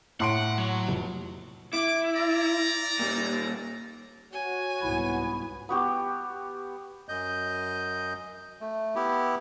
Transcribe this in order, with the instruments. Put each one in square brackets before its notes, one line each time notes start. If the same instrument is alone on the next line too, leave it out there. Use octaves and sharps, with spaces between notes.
[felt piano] A2 C6 D7 [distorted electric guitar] F#5
[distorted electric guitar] F#3
[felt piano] F1
[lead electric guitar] E4 [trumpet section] D6
[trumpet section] D5 A#5
[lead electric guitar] A#2 G3
[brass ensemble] F#4 C#5 [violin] G#5
[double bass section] C2 G#2 B3 [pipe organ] E4
[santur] B3 F#4 G4
[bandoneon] F#2 D#5 G6
A3
B3 E4 G4